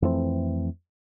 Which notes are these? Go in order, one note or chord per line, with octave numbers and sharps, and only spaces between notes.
F2 E3 A3 C4